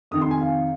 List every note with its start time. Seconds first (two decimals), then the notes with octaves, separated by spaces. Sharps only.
0.11 F2 C3 D#3 D#6
0.21 C6
0.31 G#5
0.41 F5